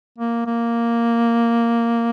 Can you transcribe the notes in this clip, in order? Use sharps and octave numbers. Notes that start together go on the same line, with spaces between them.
A#3
A#3